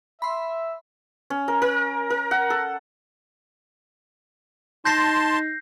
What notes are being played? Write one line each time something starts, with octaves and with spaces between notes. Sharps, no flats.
E5 B5 C6
C#4
A#4
A#4
A#4
F#5
A4
D#4 A5 C6 G6 A#6 C7